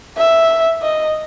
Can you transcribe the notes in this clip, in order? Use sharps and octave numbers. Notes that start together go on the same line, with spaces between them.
E5
D#5